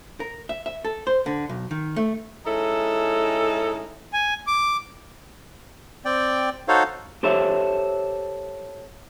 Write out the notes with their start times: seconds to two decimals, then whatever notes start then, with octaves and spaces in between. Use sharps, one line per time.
0.20 A#4
0.49 E5
0.66 E5
0.85 A4
1.07 C5
1.26 D3
1.49 B1
1.71 D#3
1.96 A3
2.45 G#3 C#4 D#4 E4 A4
4.13 G#5
4.47 D6
6.05 C4 D5 G5
6.68 D#4 F#4 A4 C5 C#5 F5
7.23 G4 A4 C5 C#5 E5